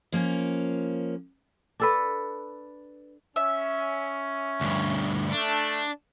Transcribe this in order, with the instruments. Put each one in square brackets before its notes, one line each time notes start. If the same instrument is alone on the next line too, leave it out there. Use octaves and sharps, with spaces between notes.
[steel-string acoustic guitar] F3 A#3 C#4
[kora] D4 A4 B4
[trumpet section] C#4 [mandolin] E5
[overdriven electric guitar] D2 G2
[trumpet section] A3 [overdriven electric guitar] D4